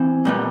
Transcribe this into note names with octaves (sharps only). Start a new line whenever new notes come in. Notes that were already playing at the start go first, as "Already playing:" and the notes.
Already playing: E3 C4
A#2 G3 B3